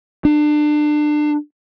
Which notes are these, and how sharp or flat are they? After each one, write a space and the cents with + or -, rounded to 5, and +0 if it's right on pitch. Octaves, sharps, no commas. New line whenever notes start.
D4 +30